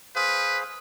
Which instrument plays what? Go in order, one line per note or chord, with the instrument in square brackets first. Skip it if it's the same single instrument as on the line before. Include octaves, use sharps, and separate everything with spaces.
[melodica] G#4 C5 F5 [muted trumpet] B4